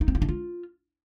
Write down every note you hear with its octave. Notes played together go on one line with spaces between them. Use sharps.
D#4
C4
E4
D#4
F4